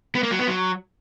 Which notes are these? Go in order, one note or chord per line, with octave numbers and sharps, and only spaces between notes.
B3
A#3
F#3
B3
F#3